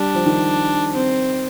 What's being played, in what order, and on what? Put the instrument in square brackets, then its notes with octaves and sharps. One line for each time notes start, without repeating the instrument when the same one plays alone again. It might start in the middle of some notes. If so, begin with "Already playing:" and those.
Already playing: [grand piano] G3 [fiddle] D4
[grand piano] F3
D#3
[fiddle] C4